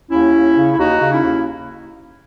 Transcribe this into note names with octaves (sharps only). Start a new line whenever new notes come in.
D#2 C#4 E4
D#2
C#3
E4
D#2 D#4 F#4
C#3
C#4 E4
D#2